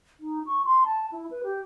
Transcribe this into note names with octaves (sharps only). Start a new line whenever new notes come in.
D#4
C#6
C6
A5
E4
B4
G4